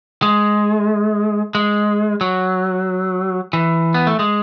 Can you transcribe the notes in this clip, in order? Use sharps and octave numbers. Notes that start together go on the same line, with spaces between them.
G#3
G#3
F#3
E3
B3
A3
G#3